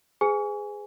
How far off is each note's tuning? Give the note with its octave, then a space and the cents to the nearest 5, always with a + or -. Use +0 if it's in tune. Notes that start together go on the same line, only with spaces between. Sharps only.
G#4 +0 B4 +45 G#5 +0